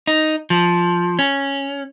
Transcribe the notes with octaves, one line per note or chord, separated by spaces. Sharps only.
D#4
F3
C#4